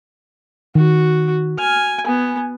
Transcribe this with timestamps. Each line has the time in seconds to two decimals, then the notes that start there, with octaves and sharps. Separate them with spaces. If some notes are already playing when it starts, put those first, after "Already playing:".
0.75 D#3 F#4
1.58 G#5 F6
2.06 B3 G#5